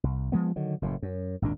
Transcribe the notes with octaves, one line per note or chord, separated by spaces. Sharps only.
C2
F3 G#3 B3
D3 D#3 F#3
F#1 F#2 A2
F#2
G#1 D#2 A#2 D4